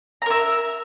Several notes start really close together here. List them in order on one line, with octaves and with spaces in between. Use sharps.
A#5 A#4 E5